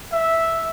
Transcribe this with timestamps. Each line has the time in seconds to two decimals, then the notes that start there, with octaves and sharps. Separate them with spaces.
0.13 E5